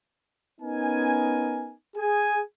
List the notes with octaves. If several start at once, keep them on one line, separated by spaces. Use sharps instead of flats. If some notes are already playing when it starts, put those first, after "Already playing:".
B3 C#4 D#4 A#4 G#5
G#4 G#5